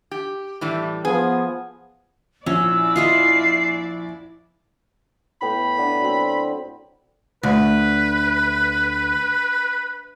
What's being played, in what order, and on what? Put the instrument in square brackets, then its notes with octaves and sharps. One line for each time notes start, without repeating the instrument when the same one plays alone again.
[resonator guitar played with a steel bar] G4
A2 E3 G3
[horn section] F3 B3 [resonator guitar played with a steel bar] G#4
[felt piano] A#1 [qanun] C#4 [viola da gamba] E4 D5 [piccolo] E6
[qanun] F4 D#5 E5 [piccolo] C7
[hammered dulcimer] A2 B3 G5 [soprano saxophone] B5
[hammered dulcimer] D4 B4 F#5
F#3 C4
[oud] D2 [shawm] B4